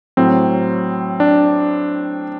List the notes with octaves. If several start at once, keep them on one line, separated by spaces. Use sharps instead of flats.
A2 F#3 C4
D4